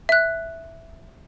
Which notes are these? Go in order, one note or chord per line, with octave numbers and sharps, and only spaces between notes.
E5 F#6